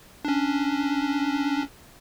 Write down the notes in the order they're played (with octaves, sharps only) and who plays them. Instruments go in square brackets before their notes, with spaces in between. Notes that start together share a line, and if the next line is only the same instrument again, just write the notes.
[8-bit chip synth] C#4 D4